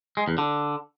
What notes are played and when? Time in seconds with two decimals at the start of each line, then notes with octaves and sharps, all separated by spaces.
0.17 G#3
0.28 E2
0.38 D3